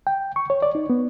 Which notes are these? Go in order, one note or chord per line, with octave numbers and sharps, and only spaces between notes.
G5
C#6
C#5
D5
D#4
B3